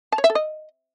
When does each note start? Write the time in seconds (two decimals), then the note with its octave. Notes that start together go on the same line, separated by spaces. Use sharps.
0.12 A5
0.18 C#5
0.24 E5
0.30 A4
0.35 D#5